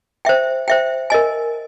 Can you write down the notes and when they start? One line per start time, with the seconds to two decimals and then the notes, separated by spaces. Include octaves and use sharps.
0.25 C5 E5 G5
0.68 C5 E5 G5
1.10 A#4 D#5 G#5